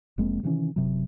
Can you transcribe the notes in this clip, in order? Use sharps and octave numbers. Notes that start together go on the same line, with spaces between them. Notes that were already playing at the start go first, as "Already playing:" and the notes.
F1 G#3 A#3 C4
C3 D#3 E3 C#4
F#1 C3 F#3